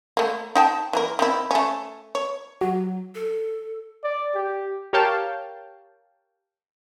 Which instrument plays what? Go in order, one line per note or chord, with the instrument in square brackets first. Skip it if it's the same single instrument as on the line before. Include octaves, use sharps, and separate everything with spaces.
[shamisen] A3 A#3
D#4 G5 A5
E3 A#3 A#4
D#3 C4 E4
A3 C#4
C#5
[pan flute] F#3 [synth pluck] F#4
[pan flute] A4
[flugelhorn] D5
G4
[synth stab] G4 A#4 C#5 F5 G5 A5